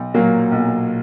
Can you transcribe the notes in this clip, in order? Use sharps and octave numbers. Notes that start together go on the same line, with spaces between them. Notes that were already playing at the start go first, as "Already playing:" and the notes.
Already playing: B1
A#2 F#3 A#3
B1